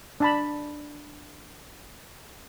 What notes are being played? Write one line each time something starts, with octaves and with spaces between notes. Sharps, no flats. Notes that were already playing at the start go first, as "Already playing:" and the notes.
D4 A5 B5